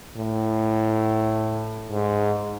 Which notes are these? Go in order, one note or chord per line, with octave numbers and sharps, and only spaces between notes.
A2
G#2